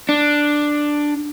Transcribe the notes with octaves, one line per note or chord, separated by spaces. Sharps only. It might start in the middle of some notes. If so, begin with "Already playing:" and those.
D4